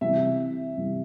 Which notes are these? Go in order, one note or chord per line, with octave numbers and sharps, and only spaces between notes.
C3 E3 G3 E5
C3 E3 G3